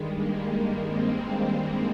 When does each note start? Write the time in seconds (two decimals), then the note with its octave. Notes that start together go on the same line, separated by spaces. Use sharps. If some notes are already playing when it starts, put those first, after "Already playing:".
Already playing: G2 D#3 G3 G#3
0.15 G3 A#3
0.86 G#3 C4